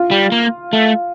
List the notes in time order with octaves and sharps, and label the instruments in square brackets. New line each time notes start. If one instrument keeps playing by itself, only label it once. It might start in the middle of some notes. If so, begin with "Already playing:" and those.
Already playing: [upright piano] F4
[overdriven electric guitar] G3
A#3
A3